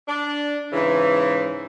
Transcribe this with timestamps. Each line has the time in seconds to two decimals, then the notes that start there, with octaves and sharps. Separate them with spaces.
0.08 D4
0.73 G#2 C#3 E3